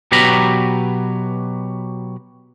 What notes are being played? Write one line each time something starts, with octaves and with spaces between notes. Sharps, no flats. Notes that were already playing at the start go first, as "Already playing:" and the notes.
B2 F#3 G4 B4 A#5 B5